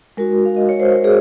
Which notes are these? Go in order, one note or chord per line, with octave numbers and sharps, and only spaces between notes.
G#3 D#4 F#4 A#4
F5
D#5
C#5
C5
A#4
G#4